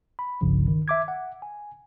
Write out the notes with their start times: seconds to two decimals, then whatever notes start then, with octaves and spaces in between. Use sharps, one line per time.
0.19 B5
0.41 G1 C2 G2 C#3 F3
0.68 D#3
0.88 E5 D6 G#6
1.08 F#5
1.42 G#5